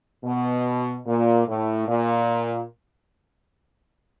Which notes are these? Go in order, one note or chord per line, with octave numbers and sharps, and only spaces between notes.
B2
A#2
A2
A#2